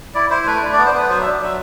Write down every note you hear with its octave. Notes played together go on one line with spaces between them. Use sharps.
E4 D5
E4 C5
C5
A3 B4
D4
D5
B3
C5
B3 B4
F#3 C5
E5
D4
F#3 E5